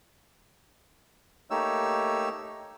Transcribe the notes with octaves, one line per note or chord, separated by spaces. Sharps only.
A3 A#3 D#4 G4 C#5 E6